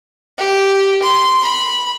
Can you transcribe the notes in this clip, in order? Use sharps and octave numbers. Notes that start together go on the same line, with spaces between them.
G4
C6
B5